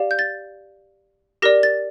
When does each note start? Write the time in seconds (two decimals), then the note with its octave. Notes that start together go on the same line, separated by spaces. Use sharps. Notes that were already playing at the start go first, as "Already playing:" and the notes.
Already playing: G4 D5 F5
0.11 G6
0.19 A6
1.42 G4 A#4 D5 A#6
1.63 A6